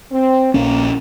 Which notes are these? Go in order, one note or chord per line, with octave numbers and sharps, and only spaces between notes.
C4
A#1 A#3 C#4